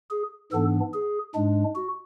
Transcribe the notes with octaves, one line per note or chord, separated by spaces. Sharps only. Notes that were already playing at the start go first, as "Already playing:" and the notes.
G#4
G#2 E3 B3 D4 A4
G#4
G#2 G#3 D4
F#4